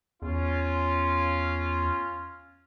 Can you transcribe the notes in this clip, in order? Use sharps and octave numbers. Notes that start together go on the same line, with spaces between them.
E2 C#4 F4